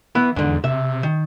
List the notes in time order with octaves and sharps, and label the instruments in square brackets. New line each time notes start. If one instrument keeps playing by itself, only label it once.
[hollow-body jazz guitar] E3 B3 E4
[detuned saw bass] E2 [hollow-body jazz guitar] G#2 D3
[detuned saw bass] C3 [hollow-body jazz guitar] E5
[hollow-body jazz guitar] D#3